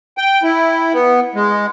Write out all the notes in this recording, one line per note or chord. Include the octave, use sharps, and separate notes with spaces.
G5
E4
B3
G#3